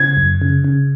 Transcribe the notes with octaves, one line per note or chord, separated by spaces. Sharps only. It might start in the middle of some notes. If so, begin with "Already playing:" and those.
Already playing: C#3 G#6
F#2
C#3
C#3